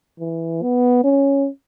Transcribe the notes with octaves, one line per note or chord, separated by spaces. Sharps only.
E3
B3
C#4